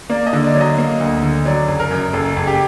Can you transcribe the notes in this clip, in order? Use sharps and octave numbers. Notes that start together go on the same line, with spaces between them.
A#3 D5
D#5
D3
D5
F#3
D#5
A#3
D2
D3
F#3 D5
F#1
A#4
F#2
F#1 A4
F#1
G4